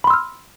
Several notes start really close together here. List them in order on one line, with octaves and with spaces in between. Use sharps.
B5 C6 E6 F6